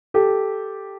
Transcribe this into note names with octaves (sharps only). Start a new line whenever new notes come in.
G4 A4